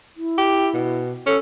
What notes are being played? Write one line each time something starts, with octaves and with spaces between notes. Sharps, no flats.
E4
G4
B2
C#4 A4